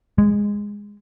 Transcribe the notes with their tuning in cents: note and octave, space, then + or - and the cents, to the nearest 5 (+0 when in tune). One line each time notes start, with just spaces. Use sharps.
G#3 -10